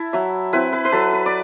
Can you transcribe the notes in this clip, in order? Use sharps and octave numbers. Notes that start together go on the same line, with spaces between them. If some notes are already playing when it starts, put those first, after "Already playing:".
Already playing: E4 A5
F#3 E5
C4 E4 B4
B4
B4
F#3 A4
B4
D5